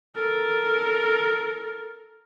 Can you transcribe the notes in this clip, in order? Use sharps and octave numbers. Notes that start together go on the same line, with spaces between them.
A4 A#4